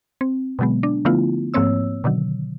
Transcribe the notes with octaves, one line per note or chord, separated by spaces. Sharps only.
C4
B2 D3 F#3 G#3 B3
D4
D3 F3 A3 B3 E4 F4
G#2 F3 A#3 C4 C#5 E6
B2 D3 D#3 F#3